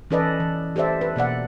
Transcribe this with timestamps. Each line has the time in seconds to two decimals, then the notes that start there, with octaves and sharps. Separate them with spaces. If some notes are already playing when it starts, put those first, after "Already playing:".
0.11 E3 C#4 A4 B4 D5 D#5
0.40 E3
0.76 G4 A4 C5 D5 E5
1.01 B4
1.16 B2 A#3 D5 F#5